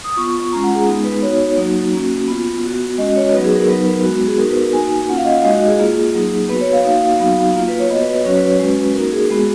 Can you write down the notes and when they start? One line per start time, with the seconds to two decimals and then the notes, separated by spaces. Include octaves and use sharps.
0.04 D#6
0.17 B3 F4 C#6
0.51 G#3 C#4 F4 A#5
0.64 F#5
0.75 G#4
0.87 G#3 B3 D#4
1.04 B4
1.22 B3 D#4 F#4 C#5
1.57 F#3 A#3 D#4 F#4
1.93 A#3 C#4 F#4
2.28 B3 F4
2.62 B3 F#4
2.98 G#3 C#4 F#4 D#5
3.16 C#5
3.33 F#3 B3 D#4 F#4 B4
3.44 G#4
3.56 A#4
3.68 F#3 B3 D#4 B4
3.85 A#4
4.03 G#3 B3 F#4
4.27 G#4
4.38 B3 D#4 F#4 A#4
4.50 B4
4.61 A#4
4.73 A#3 D#4 F#4 G#5
5.09 A#3 C#4 F4 F#5
5.17 F5
5.25 D#5
5.32 F5
5.44 G#3 D#4 F#4 D#5
5.55 F#4
5.67 G#4
5.79 A#3 F4
6.14 F#3 A#3 D#4
6.49 B3 F#4 B4
6.61 C#5
6.73 F5
6.84 A#3 D#4 F#4 F5
7.20 F#3 B3 D#4 F#4
7.55 A#3 F4
7.68 B4
7.79 C#5
7.90 B3 D#5
7.94 F#4
8.02 B4
8.14 B4
8.24 F#3 C#4 F#4 C#5
8.36 B4
8.60 G#3 C#4 F#4
8.95 A#3 D#4 F#4 A#4
9.12 G#4
9.30 G#3 B3 F#4